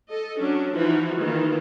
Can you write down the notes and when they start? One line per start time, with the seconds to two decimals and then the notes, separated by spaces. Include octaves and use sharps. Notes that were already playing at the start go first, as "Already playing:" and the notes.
0.10 A4 D#5
0.40 F#3 C#4 D4
0.73 E3 F3 D#4 F#4
1.19 D#3 E3 A#3 F4